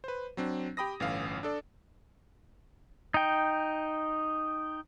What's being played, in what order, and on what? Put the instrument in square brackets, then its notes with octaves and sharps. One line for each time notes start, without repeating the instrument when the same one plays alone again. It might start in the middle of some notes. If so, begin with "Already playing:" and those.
[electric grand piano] B4 C5
F#3 C4 D4
G4 G5 B5 D#6 A#6
G1 A2 E3 C#4 F5
D4 A4 D5
[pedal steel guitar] D#4 G5